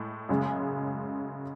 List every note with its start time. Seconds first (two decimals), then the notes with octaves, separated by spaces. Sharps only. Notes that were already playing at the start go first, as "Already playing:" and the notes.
Already playing: A2 G#3
0.29 F#2 C#3 G#3